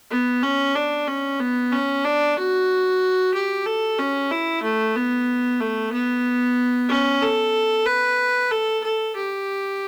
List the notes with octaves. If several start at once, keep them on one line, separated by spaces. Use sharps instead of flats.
B3
C#4
D4
C#4
B3
C#4
D4
F#4
G4
A4
C#4
E4
A3
B3
A3
B3
C#4
A4
B4
A4
A4
G4